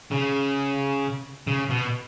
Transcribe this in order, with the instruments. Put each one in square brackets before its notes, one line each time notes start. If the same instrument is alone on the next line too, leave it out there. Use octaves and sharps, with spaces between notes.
[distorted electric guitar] C#3
C#3
B2